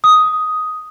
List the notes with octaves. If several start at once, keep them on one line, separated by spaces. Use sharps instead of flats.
D#6